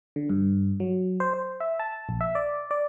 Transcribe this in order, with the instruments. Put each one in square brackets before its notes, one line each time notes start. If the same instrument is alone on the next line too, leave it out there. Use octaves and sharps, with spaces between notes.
[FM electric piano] D3
G2
F#3
C5
C5
E5
A5
A#1
E5
D5
D5